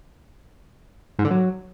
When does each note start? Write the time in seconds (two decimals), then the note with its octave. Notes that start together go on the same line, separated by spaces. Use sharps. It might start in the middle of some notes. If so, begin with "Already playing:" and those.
1.19 G#2
1.25 D3
1.31 F#3